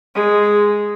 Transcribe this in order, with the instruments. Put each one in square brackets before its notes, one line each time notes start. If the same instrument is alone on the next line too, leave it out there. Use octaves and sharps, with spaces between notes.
[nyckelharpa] G#3